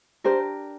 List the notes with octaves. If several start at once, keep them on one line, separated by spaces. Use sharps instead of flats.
D4 G4 A#4 C5